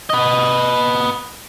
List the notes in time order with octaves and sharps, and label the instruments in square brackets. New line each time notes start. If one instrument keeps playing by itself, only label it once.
[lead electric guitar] B4 D#5